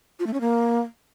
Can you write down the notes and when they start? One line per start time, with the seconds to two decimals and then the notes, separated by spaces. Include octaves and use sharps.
0.19 F4
0.27 A3
0.34 C#4
0.41 A#3